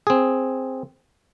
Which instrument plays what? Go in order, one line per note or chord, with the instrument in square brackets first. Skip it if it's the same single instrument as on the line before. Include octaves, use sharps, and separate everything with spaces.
[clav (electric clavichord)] C4 G#4